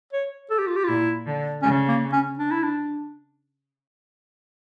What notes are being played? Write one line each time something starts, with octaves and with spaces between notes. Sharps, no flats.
C#5
A4
G4
F4
G4
F4
A#2 E4
D3
C#3 C#4
A#3
C#4
D4
E4
D4